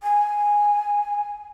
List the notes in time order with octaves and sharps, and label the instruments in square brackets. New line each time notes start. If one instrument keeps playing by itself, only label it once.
[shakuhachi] G#5